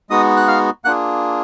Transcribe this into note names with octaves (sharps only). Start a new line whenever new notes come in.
G#3 B3 D#4 F#4 D#5 D#6
F#6
F5 F6
A#3 D4 F4 G#4 F#5 F#6